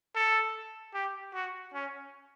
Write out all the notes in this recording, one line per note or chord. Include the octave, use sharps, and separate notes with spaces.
A4
G4
F#4
C#4